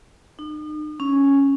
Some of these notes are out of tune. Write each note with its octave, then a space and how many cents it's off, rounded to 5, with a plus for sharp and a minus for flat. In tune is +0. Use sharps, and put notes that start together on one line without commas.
D#4 -40
C#4 +0